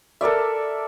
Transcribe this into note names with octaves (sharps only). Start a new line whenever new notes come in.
A4 A#4 D5 E5